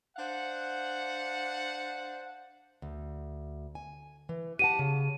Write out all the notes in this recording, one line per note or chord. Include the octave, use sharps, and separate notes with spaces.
D4 C5 F5 F#5
D2
G#5
E3
G4 F#5 A5 D#7
C#3